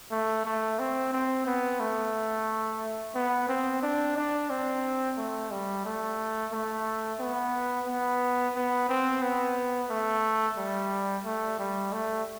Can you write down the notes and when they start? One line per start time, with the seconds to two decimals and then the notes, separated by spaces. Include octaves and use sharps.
0.11 A3
0.45 A3
0.79 C4
1.13 C4
1.46 B3
1.80 A3
3.15 B3
3.48 C4
3.83 D4
4.16 D4
4.50 C4
5.17 A3
5.51 G3
5.85 A3
6.53 A3
7.20 B3
7.87 B3
8.55 B3
8.89 C4
9.22 B3
9.90 A3
10.58 G3
11.25 A3
11.59 G3
11.93 A3